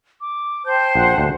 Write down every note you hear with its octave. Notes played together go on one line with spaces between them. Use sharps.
D6
C5 G5 A5 G6
A#1 F#5
D2